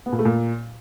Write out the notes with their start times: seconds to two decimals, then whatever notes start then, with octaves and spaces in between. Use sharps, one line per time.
0.06 B3
0.12 A#2
0.19 A3
0.25 A#2